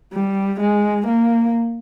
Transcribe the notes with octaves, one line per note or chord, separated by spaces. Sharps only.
G3
G#3
A#3